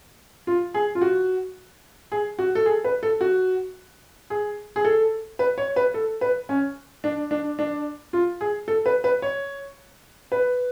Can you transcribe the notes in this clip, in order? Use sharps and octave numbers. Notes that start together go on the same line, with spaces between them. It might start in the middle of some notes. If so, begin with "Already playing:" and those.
F4
G#4
F4
F#4
G#4
F#4
A4
G#4
B4
A4
F#4
G#4
G#4
A4
B4
C#5
B4
A4
B4
C#4
D4
D4
D4
F4
G#4
A4
B4
B4
C#5
B4